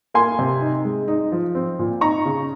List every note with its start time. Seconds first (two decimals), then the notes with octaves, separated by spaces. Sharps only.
0.14 A#3 G#5 C6
0.39 C3
0.61 D#4
0.85 G#3
1.08 D#4
1.32 F3
1.55 C4
1.79 A#2
2.01 D#4 A#5 C#6
2.25 C#3